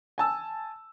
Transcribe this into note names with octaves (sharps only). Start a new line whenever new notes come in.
G#5 A5 E6